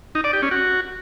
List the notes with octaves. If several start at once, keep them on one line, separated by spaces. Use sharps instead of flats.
D#4
D5
G4
C#4
F#4